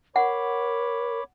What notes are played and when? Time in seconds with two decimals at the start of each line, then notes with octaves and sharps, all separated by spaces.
0.16 A#4 C#5 F#5 B5 D6